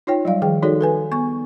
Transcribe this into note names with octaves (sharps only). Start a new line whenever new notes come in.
D#4 F4 C#5 G5
F#3 G3 D5 F5
D#3 F3 G#4 G5
D#4 F#4 G#4 A4 C#5 D5
A4 B4 G#5
B3 G#5 C#6